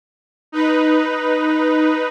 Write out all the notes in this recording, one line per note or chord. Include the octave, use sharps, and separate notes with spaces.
D#4 B4